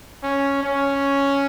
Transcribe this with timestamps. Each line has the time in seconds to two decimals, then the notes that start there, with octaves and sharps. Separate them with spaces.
0.23 C#4
0.64 C#4